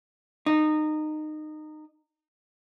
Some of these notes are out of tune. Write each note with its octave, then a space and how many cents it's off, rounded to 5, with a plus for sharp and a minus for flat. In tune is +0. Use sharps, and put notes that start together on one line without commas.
D#4 -20